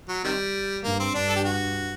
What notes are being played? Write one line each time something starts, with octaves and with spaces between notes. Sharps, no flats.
F#3
C3 D#3 G3
G2 A#3
C4
G2 D4
A4
G4
F#4